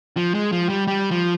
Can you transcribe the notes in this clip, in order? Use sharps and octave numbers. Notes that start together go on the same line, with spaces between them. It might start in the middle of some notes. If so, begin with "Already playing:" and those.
F3
G#3
F3
G3
G3
F3